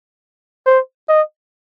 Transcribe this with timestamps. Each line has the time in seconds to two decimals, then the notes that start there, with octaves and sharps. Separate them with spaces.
0.66 C5
1.09 D#5